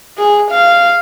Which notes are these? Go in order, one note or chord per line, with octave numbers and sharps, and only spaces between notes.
G#4
F5